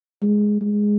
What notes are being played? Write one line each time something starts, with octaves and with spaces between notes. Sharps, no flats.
G#3
G#3